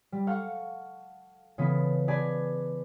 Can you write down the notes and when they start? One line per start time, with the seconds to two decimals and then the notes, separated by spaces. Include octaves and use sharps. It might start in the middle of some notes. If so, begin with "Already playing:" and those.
0.12 G3
0.27 A4 F5 F#5 C#6
1.58 C#3 E3 B3 A4 B4
2.08 G#4 B4 D5 G#5 A5